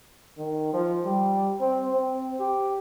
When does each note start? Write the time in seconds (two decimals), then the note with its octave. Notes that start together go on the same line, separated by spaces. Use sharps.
0.38 D#3
0.73 F3
1.05 G3
1.60 C4
1.92 C4
2.39 G4